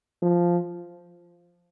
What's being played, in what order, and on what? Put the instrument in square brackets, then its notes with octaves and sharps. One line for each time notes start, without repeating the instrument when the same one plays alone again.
[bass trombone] F3